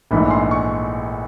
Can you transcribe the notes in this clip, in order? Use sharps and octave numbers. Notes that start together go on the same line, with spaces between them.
A#1 G#2 E3 A3 B5
C6
C#6